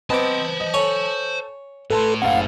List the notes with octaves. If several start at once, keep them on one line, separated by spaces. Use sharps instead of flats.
B3 C4 C5 D#5 A5 D6
D#5
A4 C#5 G#5 C#6
A2 A4 B4 A5 C6
F#1 C#3 F5 F#5